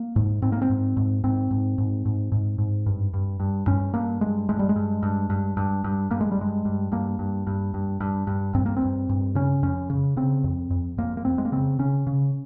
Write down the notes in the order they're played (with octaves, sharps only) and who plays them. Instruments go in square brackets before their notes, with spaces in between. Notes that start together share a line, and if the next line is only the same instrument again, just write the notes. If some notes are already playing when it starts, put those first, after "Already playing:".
Already playing: [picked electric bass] A#3
G#2
G#2 C4
A#3
C4
G#2
G#2
G#2 C4
G#2
G#2
G#2
G#2
G#2
G2
G2
G2
G2 C#4
G2 A#3
G2 G#3
G2 G#3
G3
G#3
G2
G2
G2
G2
G2
G2 A#3
G#3
G3
G2 G#3
G2
G2 A#3
G2
G2
G2
G2
G2
G2 C4
A#3
C4
G2
G2
C#3 C#4
F2 C#4
C#3
C#3 C4
F2
F2
F2 A#3
A#3
F2 C4
G#3
A#3
C#3 C4
C#3 C#4
C#3